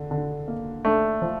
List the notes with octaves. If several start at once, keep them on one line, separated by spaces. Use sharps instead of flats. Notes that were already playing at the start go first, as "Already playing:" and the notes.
Already playing: D3
D3
A#3
A3 D4
F3